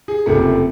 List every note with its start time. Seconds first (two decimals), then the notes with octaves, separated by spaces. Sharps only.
0.08 G#4
0.26 F#1 F2 C3 F3 A3